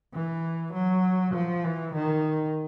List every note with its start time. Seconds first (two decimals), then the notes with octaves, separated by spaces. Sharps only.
0.13 E3
0.74 F#3
1.34 F3
1.64 E3
1.94 D#3